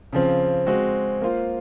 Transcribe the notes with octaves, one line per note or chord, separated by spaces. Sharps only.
C#3 F3 C4
G#3 C4 F#4
A#3 F4 C5